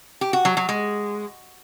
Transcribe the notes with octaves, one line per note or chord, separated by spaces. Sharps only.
G4
F#4
F#3
F#3
G#3